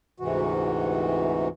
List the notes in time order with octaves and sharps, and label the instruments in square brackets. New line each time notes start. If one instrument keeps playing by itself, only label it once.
[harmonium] D2 G#2 C3 E3 F#4